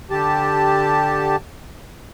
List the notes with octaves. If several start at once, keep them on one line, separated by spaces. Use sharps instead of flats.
D3 G4 A5